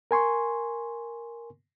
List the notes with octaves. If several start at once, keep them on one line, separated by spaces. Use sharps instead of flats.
A#4 G#5 C6 C#6